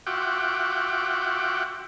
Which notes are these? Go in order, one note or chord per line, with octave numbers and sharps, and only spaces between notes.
F4 F#4 E5 F#5 G5 D6